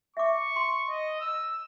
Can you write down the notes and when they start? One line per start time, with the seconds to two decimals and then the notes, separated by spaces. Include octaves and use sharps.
0.17 E5 C#6 D6
0.56 C6
0.89 D#5
1.21 E6